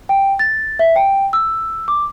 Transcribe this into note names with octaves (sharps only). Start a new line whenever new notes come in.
G5
A6
E5
G5
E6
D6